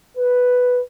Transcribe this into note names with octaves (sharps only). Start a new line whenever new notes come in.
B4